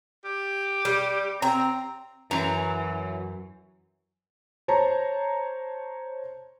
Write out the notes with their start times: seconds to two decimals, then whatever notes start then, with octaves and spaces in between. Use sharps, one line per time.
0.25 G4
0.85 G3
1.42 C4 A#5
2.31 F#2 E3 F#3 A#5
4.68 C5 C#5 A5 A#5